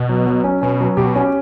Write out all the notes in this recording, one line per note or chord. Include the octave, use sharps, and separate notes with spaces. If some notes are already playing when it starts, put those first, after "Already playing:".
Already playing: B2
F#3
F#3
C#4
B2 C#4
F#3
B2 G4
C#4